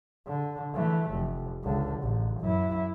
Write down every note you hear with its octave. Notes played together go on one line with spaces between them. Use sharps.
D3
E3 A3
F1
C#2 D3
A1
F#2 E4